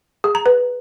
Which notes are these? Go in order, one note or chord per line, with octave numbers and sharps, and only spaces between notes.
G#4
A#5
B4